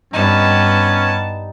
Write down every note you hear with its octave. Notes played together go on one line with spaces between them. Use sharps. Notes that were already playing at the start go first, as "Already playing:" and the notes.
G2 G3 B3 C#4 D#4 A5